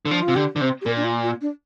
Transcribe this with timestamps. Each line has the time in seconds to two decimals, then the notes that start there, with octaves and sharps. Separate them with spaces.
0.05 D3
0.08 F3 D4
0.22 F4
0.28 C3
0.36 D3 G4
0.56 D3
0.61 C3 C5
0.81 G4
0.86 A#2 A#4
0.97 D4
1.04 F4
1.23 F4
1.41 D4